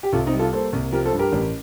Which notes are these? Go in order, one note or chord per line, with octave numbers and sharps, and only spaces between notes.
G4
C2 F4 A4
C4 D#4
G3
F4 A4
A#3 A4 C5
C2
F3 G4 A#4
A4 C5
G2
G4 A#4
A1